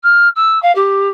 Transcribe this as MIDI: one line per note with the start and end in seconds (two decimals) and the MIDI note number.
0.03 0.28 89
0.35 0.61 88
0.62 0.73 77
0.75 1.09 67